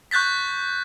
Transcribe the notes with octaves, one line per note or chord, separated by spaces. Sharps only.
C#6 F#6 G6 A6 B6